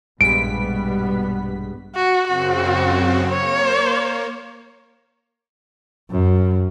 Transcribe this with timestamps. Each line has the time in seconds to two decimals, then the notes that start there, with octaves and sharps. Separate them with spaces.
0.21 A#1 G2 B2 G3 G#3 B3 B6 D7
1.95 F#4
2.28 F#2 C#3 C4 F#4
3.30 A#3 C#5
6.10 F#2